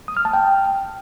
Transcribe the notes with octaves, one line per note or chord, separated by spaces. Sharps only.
D#6
F6
A5
G5